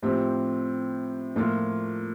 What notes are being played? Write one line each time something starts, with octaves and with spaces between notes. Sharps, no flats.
A2 F3 C4 G4
A2 F3 A#3 F4